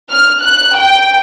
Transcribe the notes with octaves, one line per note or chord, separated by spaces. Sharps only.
F6
F#6
G5